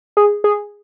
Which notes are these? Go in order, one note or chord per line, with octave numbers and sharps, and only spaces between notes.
G#4
G#4